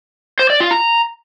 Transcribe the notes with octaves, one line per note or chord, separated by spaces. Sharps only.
C5
D5
F4
A#5